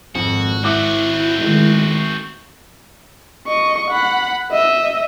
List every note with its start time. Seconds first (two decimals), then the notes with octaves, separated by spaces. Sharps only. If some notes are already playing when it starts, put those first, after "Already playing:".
0.15 G#1 F2 F#4
0.64 C4 E4 F#4 E5 D6 F#6
1.37 D#3 G#3 A3
3.47 D#5 C#6
3.91 F#5 B5
4.52 D#5 E5